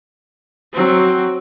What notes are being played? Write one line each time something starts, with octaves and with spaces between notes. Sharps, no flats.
F#3 C4